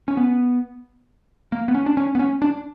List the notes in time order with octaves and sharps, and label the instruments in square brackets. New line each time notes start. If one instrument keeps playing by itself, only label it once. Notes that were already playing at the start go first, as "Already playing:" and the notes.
[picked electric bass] C#4
B3
A#3
B3
C#4
D4
C#4
B3
C#4
D4